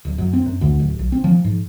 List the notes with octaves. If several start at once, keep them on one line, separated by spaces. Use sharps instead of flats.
D1
F#2
C4
F#2
D2
D1
B1
C4
F3
G#2